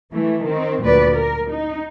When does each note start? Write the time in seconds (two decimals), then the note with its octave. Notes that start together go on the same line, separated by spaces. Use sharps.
0.12 E3 A3
0.43 D#3 C4
0.82 D2 A#2 F#3 B4 D5
1.16 A#4
1.49 D#4